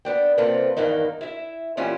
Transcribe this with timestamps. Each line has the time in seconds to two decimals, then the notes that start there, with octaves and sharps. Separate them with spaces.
0.05 B3 D4 G5
0.38 C3 A#3 C4 F4 A4 B4
0.77 E2 G2 D#3 A#3 D#4
1.21 E4 E5
1.77 A#2 E3 C#4 E4 F4 G4